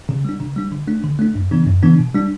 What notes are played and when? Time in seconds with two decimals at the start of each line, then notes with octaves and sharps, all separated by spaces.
0.09 C#3
0.25 G3 D4
0.40 C#3
0.56 G3 D4
0.72 D3
0.87 A3 D4
1.04 D3
1.19 A3 D4
1.35 F#2
1.51 C#3 E3 B3 D4
1.67 F#2
1.83 C#3 E3 B3 D4
1.98 B2
2.14 G3 D4